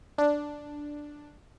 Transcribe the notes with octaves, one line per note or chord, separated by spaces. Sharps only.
D4